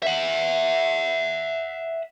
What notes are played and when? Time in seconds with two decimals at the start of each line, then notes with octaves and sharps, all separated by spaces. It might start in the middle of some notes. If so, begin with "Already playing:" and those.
0.02 E5 F#5